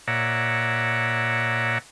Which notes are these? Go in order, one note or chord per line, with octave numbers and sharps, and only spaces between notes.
A#2 C#5 D5 E5 F#5 A#5